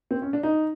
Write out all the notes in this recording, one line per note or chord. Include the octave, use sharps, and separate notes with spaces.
C4
C#4
D4
D#4